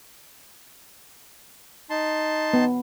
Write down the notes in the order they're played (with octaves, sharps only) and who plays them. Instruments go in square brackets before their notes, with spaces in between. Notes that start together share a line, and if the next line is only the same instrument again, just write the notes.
[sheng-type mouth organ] D#4 A5 C6
[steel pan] B3